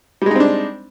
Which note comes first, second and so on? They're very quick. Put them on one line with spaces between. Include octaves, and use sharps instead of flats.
G3 G#3 D#4 C4 D4